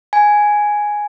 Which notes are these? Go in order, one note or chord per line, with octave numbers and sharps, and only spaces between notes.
G#5